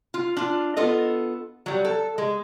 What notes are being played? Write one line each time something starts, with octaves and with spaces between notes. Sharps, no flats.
F4
D4 F4
B3 F4 A4 D#5
F#3 G3
A4
G#3